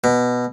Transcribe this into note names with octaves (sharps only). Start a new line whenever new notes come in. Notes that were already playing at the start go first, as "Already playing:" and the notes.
B2